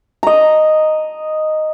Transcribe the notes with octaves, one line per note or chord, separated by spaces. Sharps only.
D#5 A#5